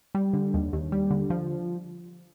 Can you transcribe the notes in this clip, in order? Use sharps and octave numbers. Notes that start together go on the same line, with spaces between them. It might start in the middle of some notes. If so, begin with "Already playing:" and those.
G3
D3
D#2
D#2
G3
D3
F3